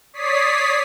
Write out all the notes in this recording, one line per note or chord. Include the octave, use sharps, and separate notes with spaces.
C#5 D5 D#6 B6 C7